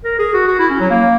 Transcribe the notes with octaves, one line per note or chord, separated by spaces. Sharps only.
A#4
G#4
F#4
F#4
E4
C#4
F#3
A#3